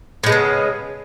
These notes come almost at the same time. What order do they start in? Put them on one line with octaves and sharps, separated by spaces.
A2 G#3 B3 C#3